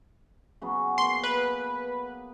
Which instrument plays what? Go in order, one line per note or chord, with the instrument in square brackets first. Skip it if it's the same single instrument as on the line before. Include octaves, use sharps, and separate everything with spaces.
[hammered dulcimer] C#3 F#3 B3
[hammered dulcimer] A#3 B3 [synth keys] C6
[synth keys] B4